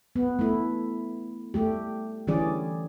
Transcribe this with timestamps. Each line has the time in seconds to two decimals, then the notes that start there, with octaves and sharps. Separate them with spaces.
0.16 B3
0.39 A3 E4
1.54 G3 A3 G4
2.27 D3 E3 G3 C#4 G#4 D5